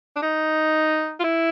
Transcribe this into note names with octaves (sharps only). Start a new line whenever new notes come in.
D4
D#4
F4
E4